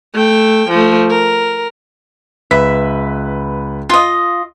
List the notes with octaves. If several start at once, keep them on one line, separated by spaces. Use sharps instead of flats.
A3 G5
F3 A3
A#4
C#2 B4 E5 B6
F4 D#5